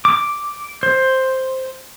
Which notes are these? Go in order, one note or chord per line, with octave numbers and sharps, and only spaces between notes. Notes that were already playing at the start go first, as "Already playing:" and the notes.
D6
C5